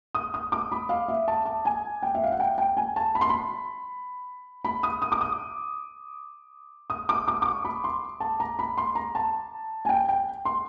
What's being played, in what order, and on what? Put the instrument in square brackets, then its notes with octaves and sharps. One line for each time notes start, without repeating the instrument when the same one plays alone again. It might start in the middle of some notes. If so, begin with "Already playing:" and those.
[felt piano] D#6
D#6
D6
B5
F5
E5
A5
A5
G#5
G5
E5
F5
F#5
G5
G5
G#5
A5
B5
C6
B5
B5
D#6
D#6
D6
D#6
D#6
D6
D6
D6
C#6
B5
C6
A5
A#5
B5
C6
A#5
A5
G#5
G5
G5
C6